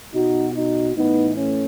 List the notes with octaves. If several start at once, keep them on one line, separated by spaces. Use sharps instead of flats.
B2 D#4 F#4
D#4 F#4
A2 E3 B3 D#4
A3 C#4